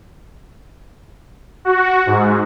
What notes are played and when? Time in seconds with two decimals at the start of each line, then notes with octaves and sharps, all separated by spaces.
1.65 F#4
2.06 G#2